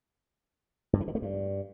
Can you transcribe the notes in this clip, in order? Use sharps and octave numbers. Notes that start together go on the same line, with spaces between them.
G2
E3
D#3
A3
G2